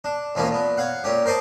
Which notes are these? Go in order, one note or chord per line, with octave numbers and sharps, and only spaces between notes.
D4
D#2 E3 F3 A#3 C#4
A#2 B3
C#5 F5 F#5
A#2 C#4 G4
A#4 C5 D5 D#5 A5